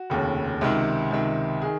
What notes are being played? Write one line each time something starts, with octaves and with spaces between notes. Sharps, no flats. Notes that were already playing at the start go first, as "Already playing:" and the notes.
Already playing: F#4
F1 D#2 C#3
C#2 C3 D#3
C#2 C3 D#3
D#3 G#4